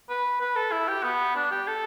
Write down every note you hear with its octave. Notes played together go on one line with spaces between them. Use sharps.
B4
B4
A4
E4
G4
B3
D4
G4
A4